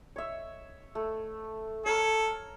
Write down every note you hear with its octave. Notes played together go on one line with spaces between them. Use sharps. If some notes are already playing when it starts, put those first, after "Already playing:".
C#5 E5
A3
A4 A#4 C#5